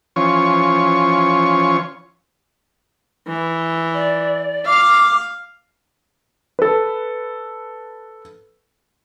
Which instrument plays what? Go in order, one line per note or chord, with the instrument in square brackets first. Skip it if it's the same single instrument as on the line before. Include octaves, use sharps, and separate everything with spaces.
[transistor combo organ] E3 F3 C#4 F4 C#5 C#6
[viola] E3
[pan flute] D5
[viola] F5 [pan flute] D6
[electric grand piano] A4 B4